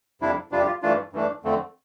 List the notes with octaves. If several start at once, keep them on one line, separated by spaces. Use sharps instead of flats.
F2 C3 G3 D4 E4
F2 C3 G3 D4 F4
G4
F4
G2 E3 A3 D4 F4
G2 E3 A3 D4
F2 D3 A3 C4